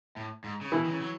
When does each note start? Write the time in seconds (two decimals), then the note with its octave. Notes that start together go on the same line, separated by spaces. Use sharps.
0.17 A2
0.44 G#2
0.61 C#3
0.72 B2 E3 E4
0.85 D#3
0.91 C#3
1.01 F#3